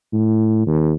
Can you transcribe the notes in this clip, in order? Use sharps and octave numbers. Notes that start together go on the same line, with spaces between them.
A2
D#2